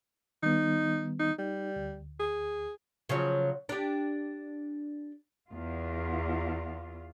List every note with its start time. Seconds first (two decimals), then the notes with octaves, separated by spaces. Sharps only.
0.43 D#3 G3 B3 D#4
1.19 D#4
1.39 G3 D#4
1.76 D2
2.19 G#4
3.09 C#3 F3 F#3
3.69 D4 G4
5.50 E2 F4